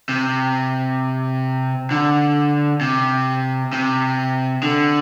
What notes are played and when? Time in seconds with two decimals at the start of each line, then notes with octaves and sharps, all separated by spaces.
0.09 C3
1.91 D3
2.81 C3
3.73 C3
4.63 D3